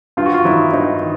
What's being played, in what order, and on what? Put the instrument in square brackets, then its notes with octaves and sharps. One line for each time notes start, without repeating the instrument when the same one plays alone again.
[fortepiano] G2 F4
F#4
F4
D#3 F#3 E4
G2 D#4
D#3